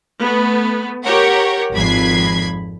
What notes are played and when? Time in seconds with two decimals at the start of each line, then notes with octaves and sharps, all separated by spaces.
0.21 A3 B3
1.03 G4 A#4 C#5 F#5
1.73 G#1 F2 B5 G#6 C7